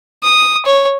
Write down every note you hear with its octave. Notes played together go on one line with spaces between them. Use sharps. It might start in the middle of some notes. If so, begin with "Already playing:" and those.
D#6
C#5